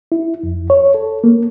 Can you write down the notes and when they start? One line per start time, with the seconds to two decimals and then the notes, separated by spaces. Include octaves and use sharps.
0.12 E4
0.43 F2
0.70 C#5
0.94 A4
1.24 A#3